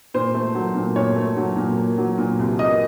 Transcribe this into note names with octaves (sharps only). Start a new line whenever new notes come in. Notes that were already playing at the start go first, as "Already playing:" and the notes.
A#2 C5
A3
F#3
A#2
A#2 C#5
A3
F#3
A#2
A#3
F#3
A#2
C2
A#3 D#5